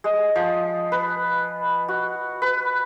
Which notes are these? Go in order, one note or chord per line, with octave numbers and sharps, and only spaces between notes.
G#3
F3
B4
F#4
B4